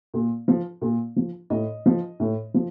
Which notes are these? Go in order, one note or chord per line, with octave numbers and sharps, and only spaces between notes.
A#2
F3
A#2
F3
A2 D#5
F3
A2
F3